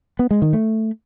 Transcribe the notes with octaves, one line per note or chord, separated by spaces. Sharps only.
B3
G#3
D#3
A3